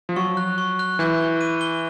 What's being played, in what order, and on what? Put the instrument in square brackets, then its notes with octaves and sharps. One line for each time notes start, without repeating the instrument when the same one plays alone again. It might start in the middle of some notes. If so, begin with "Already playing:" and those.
[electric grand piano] F3
[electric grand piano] F#3 [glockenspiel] C#6
[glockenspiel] F#6
C#6
F#6
[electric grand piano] E3 [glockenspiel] G6
[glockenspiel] G7
D#7
G7